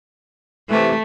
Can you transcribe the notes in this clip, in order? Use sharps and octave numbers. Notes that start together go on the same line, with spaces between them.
C3 E3 A3